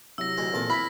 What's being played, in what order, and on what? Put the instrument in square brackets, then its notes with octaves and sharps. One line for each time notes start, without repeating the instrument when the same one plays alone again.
[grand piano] C3 F#3 E4 [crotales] E6 A#6
[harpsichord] D2 G#3
[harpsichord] A#1 E2 A5 [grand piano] B3 C4 A4
[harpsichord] E4 [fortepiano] B5 [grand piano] F6 [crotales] B6